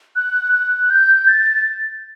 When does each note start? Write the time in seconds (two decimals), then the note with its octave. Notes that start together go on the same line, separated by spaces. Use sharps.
0.16 F#6
0.53 F#6
0.90 G6
1.28 A6